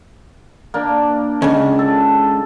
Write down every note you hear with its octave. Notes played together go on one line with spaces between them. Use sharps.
A#3 D4
C#2 C#3
A4